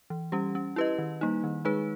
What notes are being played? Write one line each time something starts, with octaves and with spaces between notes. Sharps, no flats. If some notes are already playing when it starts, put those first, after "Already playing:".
E3
G3 C#4 G4
C#4
E4 G4 B4 D#5
D#3
G3 A#3 D#4
D#3
G#3 D#4 G#4 B4